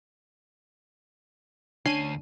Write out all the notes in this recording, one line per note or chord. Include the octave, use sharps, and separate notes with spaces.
D2 C#4 D4 A5 C7 D#7